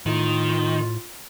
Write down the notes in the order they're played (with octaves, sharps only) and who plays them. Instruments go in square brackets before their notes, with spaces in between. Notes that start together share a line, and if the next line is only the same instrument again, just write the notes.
[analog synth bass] A2 [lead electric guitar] D#3 [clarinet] F4